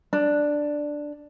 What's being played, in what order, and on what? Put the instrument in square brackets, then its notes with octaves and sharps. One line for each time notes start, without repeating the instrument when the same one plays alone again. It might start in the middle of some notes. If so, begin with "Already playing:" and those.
[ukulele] D4